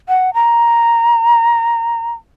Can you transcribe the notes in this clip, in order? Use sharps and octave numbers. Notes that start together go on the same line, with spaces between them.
F#5
A#5